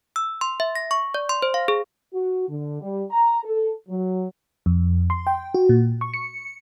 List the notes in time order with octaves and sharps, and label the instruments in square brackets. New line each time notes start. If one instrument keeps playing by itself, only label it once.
[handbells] E6
C6
E5
A#6
C#6
D5
C6
C5
F5
G#4
[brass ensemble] F#4
D3
G3
A#5
A4
F#3
[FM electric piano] F2
C6
G5
F#4
A#2
C#6
C#7